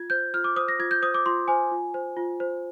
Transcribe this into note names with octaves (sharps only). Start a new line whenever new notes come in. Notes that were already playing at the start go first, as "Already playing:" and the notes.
Already playing: F4 G#6
C5 G6
F4 F6
D6
C5 D#6
A#6
F4 G#6
G6
C5 D#6
D6
F4 C6
C5 G#5
F4
C5
F4
C5